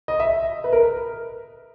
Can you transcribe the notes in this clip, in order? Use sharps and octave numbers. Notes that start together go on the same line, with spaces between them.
D#5
E5
B4
A#4